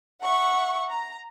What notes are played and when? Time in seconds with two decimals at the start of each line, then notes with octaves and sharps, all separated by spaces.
0.24 E5 F#5 C#6
0.90 A#5